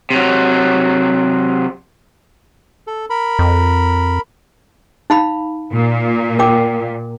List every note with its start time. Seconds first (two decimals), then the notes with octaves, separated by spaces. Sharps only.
0.11 C3 F#3
2.87 A4
3.10 A#4 B5
3.39 F2
5.10 D#4 F5 B5
5.72 A#2
6.39 A#4 G5 D6